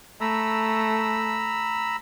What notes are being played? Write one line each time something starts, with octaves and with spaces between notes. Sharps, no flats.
A3 A#5 B5 E6